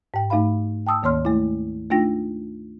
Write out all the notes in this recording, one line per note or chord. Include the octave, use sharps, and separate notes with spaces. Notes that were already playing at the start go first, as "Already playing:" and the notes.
G#2 G5
G#2 A3 D#4 E5 F5 B5
G5 A5 D#6 E6
D2 D#3 A#3 C#5 C6 F6
G#3 A3 E4
A3 D4 D#4 F4 G5 A#6